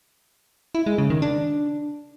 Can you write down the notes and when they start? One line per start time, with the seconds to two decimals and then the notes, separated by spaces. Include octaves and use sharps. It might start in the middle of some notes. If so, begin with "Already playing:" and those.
0.75 E4
0.86 G#3
0.98 C#3
1.10 D#3
1.22 D4